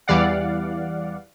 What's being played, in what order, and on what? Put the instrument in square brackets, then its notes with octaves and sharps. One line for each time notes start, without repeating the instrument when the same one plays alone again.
[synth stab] E2 E3 G3 D5 F5 F#5